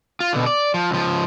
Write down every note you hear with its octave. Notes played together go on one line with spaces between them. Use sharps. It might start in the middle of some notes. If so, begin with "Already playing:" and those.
F4
B2 D3
D5
F3
C#2 F3